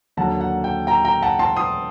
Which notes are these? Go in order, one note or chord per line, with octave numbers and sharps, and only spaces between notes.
D#2 D3 F#3 A#3 F#5 A5
F#5
G5
G5 A#5
G5 A#5
F#5 A5
A5 C6
C6 D#6